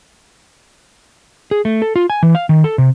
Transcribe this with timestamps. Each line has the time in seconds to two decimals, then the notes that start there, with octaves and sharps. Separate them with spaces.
1.51 G#4
1.65 A3
1.82 A4
1.96 F4
2.10 G#5
2.23 E3
2.35 F5
2.49 D#3
2.64 A4
2.78 C3